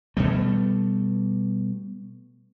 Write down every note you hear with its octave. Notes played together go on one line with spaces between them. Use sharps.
B2 G3 A3